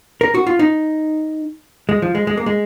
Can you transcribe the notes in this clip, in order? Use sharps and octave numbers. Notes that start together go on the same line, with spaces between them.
A#4
F#4
F4
D#4
G#3
F3
G#3
G#3
A#3
G#3